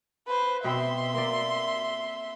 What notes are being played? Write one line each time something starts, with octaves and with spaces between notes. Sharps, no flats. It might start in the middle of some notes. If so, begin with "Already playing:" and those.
B4 C5
B2 C4 E5 C6
A#3 D5